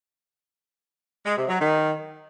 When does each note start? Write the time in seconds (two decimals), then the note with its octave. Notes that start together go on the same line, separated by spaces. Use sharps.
1.24 G#3
1.36 C3
1.48 F#3
1.59 D#3